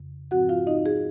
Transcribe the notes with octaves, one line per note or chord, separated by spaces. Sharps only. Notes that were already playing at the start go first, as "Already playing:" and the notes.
Already playing: F2 C#3
G#2 F3 C4 F#4 F#5
F4 F5
D#4 D#5
G#4